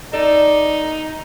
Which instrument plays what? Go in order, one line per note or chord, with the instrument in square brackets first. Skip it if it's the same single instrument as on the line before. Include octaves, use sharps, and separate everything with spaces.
[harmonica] D#4 [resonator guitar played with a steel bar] A4 D5